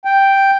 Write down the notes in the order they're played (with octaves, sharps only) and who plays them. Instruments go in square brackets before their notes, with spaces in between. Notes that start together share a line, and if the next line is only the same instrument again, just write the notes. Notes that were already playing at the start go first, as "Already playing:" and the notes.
[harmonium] G5